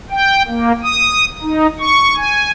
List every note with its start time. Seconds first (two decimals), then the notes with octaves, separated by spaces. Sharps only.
0.11 G5
0.48 A#3
0.83 D#6
1.42 D#4
1.80 C#6
2.17 G#5